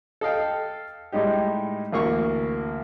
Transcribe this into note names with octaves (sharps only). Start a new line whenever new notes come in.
A4 D#5 F5 G5
A2 G3 G#3 D#4 G4
A1 D2 A#3 F5 C#6